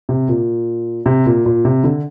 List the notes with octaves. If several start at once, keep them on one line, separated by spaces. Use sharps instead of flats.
C3
A#2
C3
A#2
A#2
C3
D3